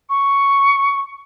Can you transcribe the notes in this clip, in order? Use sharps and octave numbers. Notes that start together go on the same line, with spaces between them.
C#6